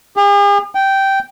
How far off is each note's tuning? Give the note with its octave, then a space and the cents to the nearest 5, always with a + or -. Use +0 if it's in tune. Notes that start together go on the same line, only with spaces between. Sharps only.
G#4 -45
G5 -10